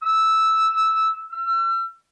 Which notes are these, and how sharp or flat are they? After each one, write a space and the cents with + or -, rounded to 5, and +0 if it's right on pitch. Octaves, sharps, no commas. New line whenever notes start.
E6 -10
E6 +40